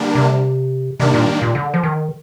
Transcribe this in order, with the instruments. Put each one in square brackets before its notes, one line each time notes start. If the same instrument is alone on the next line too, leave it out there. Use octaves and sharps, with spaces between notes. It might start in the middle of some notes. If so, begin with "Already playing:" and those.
Already playing: [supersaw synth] D3 G3 A#3 D4
[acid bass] C3
[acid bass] C3 [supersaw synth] D#3 G3 A#3 D4
[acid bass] A#2
A#2
D3
F3
D#3